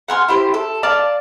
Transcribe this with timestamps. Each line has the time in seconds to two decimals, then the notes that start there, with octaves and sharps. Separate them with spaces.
0.08 F#5 G#5 C6 F6
0.28 E4 G4 C5
0.54 A4
0.83 D5 F5 A5 D6